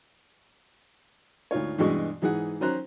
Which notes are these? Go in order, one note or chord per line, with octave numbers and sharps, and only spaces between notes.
D2 G#2 F4 C#5
G2 B2 E3 G#3 C#6
G#2 E3 G#4 F#5
D#3 F#3 C#4 C5 A#5 F#6